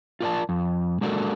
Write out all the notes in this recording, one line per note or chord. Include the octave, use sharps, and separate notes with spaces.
F4 A#4 D5 A5
F2
G#3 A#3 D4 F#4 A4 A#4